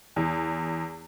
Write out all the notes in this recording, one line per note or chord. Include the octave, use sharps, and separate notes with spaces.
E2